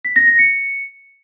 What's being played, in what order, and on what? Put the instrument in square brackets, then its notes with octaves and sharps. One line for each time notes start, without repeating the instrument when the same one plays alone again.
[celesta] B6
A#6
A#6
C#7